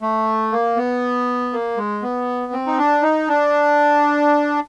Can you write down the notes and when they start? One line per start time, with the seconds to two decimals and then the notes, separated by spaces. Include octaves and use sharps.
0.02 A3
0.52 A#3
0.77 B3
1.53 A#3
1.77 G#3
2.02 B3
2.53 C4
2.67 D#4
2.78 D4
3.02 D#4
3.28 D4